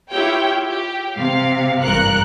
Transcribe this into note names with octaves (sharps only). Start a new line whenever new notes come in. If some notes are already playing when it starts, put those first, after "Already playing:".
E4 F4 G4 C#5 G5
G4
C3 F5
G#1 E2 G2 A#4 F#6 C#7